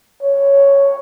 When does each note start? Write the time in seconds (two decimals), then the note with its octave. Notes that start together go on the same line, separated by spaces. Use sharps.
0.23 C#5